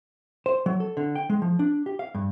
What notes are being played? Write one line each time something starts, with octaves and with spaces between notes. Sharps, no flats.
C5
F#3
A4
D3
G5
G#3
F3
D4
G4
F5
G2